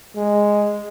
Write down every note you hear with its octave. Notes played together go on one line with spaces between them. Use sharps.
G#3